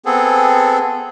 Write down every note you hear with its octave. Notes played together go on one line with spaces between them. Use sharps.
B3 C4 G#4 A4